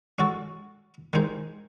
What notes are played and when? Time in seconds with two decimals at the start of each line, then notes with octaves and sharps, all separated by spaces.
0.19 G#3 C#4 F#4 A4
1.13 D#3 G#3 D#4 G#4 C5